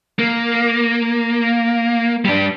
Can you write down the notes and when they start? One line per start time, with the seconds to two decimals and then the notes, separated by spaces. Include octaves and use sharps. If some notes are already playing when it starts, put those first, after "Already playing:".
0.19 A#3
2.25 G3 D4